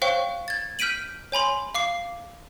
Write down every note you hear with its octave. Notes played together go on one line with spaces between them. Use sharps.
C5 C#5 F5 G5 C#6
G#6 A6
F6 G6 B6 D7 D#7 F#7
C#5 G#5 B5 C6
F5 D6 C7